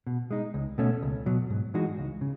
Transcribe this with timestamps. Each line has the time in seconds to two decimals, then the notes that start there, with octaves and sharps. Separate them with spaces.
0.07 B2
0.31 G#3 D#4
0.54 C#2
0.78 B2 A3 C#4
1.03 C#2
1.26 B2 F#3
1.50 G#2
1.74 E3 G#3 D#4 F#4
1.98 C#2
2.21 C#3